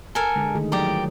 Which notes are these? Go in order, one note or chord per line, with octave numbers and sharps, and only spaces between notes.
A4 A#4 G#5
D3 G#3
D#3 A3 G#4
F3 F#3 G4 D5 A#5